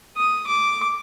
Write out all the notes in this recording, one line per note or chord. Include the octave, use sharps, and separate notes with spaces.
D#6
D6